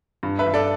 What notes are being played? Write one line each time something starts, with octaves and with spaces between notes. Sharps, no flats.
G2
B4 E5
G2
A4 D5